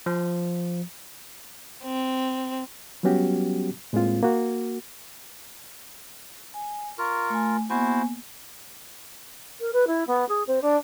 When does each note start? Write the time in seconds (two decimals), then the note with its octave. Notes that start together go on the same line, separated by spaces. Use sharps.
0.06 F3
1.84 C4
3.03 F#3 G3 B3 C#4 F#4 G4
3.93 A2 G#3 A#3 C4 F4
4.23 A#3 F#4
6.54 G#5
6.98 F4 A#4 C#6
7.30 A3 G#5
7.70 A#3 B3 E4 F#4 C5 G#5
9.60 A#4
9.73 B4
9.87 E4
10.07 B3
10.28 G#4
10.47 C4
10.62 D4